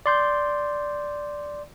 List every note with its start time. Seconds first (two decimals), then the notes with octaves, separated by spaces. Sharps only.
0.06 D5 C6 G6